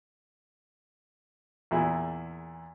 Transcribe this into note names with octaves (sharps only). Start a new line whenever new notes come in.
E2 A#2 E4 G#4